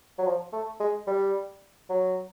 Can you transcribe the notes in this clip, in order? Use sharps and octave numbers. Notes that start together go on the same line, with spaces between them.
F#3
F3
A3
G#3
G3
F#3